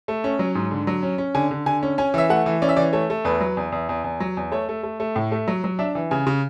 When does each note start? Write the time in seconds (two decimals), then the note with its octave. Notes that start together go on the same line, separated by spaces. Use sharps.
0.08 A3
0.24 C#4
0.39 F#3
0.55 G#2
0.71 D3
0.87 F#3
1.03 C#4
1.18 C#4
1.35 D3 G#5
1.51 D3
1.66 D3 G#5
1.83 C#4
1.98 C#4 G#5
2.14 E3 E5
2.29 A3 F#5
2.46 E3
2.62 C#4 D5
2.69 E5
2.76 E3 D5
2.93 A3 C#5
3.10 A3
3.25 E2 B4
3.41 F#3
3.57 E2
3.72 E2
3.89 E2
4.04 E2
4.20 F#3
4.37 E2
4.52 A3 C#5
4.69 A3
4.83 A3
5.00 A3
5.16 A2
5.32 A3
5.48 F#3
5.64 F#3
5.79 D4 E5
5.95 E3
6.11 C#3 G#5
6.27 C#3